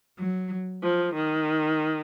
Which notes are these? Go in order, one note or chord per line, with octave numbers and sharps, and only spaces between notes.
F#3
F3
D#3